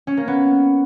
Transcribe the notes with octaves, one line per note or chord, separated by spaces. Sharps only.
C#4
A#3
B3